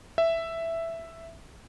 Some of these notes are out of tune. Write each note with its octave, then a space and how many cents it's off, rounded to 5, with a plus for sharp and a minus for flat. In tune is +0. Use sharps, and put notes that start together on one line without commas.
E5 +5